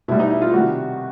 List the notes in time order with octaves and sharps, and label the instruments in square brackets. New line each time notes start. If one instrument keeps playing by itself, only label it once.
[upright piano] B2 E4
G3
D#4
E4
F4
C3 D#3 G3 F#4